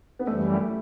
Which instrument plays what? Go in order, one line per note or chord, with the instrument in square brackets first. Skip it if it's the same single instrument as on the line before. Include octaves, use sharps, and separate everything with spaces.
[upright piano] B3
[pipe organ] F#2 E3 G3 [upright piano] A3